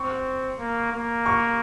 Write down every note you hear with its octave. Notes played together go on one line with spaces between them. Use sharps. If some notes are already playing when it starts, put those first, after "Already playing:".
Already playing: C4 C#6
A#3
A#3
C#6